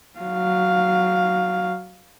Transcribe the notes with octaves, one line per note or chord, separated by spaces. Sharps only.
F#3 F5